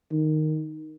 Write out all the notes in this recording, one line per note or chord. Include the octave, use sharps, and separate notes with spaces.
D#3